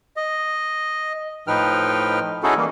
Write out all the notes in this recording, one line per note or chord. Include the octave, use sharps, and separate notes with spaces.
D#5
A2 F3 D#4 B4 G5 F6
C#4 D#4 E4 F#4 G#4 A4
E3 G3 A#3